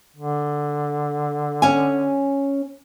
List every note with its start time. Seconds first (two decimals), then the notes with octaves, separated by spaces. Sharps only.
0.16 D3
1.62 C#4 G#5